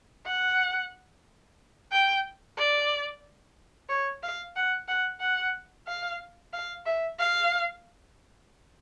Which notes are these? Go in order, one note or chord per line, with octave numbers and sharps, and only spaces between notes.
F#5
G5
D5
C#5
F5
F#5
F#5
F#5
F5
F5
E5
F5